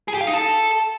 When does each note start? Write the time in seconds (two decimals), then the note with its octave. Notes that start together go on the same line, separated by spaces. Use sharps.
0.08 G#4
0.14 G4
0.21 F5
0.27 D#4
0.34 A4